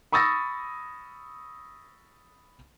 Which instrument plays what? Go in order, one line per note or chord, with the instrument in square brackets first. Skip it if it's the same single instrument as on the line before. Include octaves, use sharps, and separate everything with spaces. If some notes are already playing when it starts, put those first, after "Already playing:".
[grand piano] B5 C#6 D#6 E6 A6 A#6